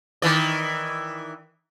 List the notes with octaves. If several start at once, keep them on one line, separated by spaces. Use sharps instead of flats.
D#3 E3 D5